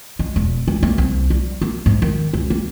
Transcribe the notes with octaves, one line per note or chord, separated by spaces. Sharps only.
G#3
E1
E3
A#3
C2
G3
A#3
G#2
D#3
C#2
A#3